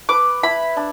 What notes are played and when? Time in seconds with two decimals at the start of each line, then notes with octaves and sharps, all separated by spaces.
0.09 B4 D6
0.43 E4 B5
0.77 D4